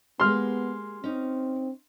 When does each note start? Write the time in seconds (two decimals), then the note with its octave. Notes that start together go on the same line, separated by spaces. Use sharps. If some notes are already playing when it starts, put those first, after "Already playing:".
0.20 G#3 A#3 B3 G4 C6 F6
1.04 C4 C#4 D#4